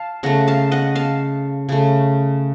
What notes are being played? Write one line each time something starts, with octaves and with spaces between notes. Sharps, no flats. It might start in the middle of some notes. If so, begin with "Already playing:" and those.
Already playing: F5 A5
C#3 A3 F#5 A#5
F5 A5
D#5 F#5
F5 A5
C#3 A3